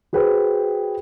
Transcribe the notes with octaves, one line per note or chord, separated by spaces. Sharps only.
F#4 G#4 B4 C5 G5